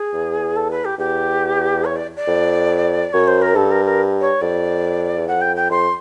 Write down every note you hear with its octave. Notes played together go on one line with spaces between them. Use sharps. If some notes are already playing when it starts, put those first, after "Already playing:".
Already playing: G#4
E2
A4
B4
G4
E2 G4
C#5
D5
D5
F2
F#2 C#5
C5
A#4
G2 A4
A#4
A#4
C#5
F2 D5
E2
F2 F#5
G5
G5
F2 C6